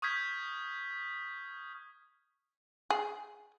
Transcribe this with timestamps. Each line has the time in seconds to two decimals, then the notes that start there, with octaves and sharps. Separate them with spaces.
0.02 C#6 D#6 F6 G6 G#6 B6
2.90 G#4